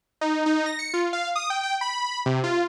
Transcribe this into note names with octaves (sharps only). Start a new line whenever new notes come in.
D#4
D#4
A#6
C#7
F4
F5
D#6
G5
G5
B5
C3
F4